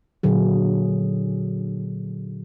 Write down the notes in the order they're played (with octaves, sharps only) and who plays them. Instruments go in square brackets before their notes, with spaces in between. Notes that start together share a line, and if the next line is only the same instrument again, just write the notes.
[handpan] A#2 D3 F#3 G#4